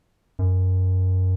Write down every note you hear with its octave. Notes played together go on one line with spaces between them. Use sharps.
F#2